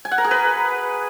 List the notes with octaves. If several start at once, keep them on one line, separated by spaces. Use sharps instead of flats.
G#5
F#5
A#4
G#4
B4